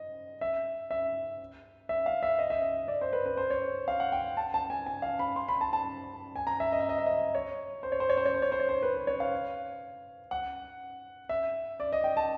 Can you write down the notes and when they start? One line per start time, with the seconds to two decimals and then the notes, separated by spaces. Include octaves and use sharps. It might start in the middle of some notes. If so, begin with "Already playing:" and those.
Already playing: D#5
0.41 E5
0.91 E5
1.89 E5
2.06 F5
2.23 E5
2.39 D#5
2.50 E5
2.62 D#5
2.88 D5
3.01 C5
3.13 B4
3.26 B4
3.37 C5
3.50 C#5
3.88 F5
4.00 F#5
4.12 G5
4.37 A5
4.54 A5
4.70 G#5
4.87 G#5
5.02 F5
5.19 B5
5.36 C6
5.48 B5
5.61 A5
5.73 A5
6.36 G#5
6.47 A#5
6.60 E5
6.72 D#5
6.80 E5
6.89 D#5
6.98 E5
7.06 D#5
7.35 C#5
7.83 C5
7.92 C#5
8.00 C5
8.10 C#5
8.17 C5
8.25 C#5
8.34 C5
8.42 C#5
8.52 C5
8.60 C#5
8.69 C5
8.82 B4
8.95 C5
9.07 C#5
9.20 F5
10.31 F#5
11.29 E5
11.80 D5
11.93 D#5
12.04 G5
12.17 A5